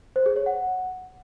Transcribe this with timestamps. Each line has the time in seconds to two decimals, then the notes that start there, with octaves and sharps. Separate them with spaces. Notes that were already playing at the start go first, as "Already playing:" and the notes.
0.16 C5
0.26 G#4
0.36 C#5
0.46 F#5